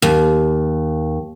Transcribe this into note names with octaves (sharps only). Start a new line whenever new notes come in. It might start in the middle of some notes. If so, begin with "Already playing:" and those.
D#2